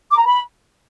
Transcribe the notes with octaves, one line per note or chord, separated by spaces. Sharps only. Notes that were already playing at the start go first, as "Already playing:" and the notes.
D6
A#5
B5